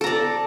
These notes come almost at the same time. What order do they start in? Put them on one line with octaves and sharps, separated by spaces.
A4 A#5 D5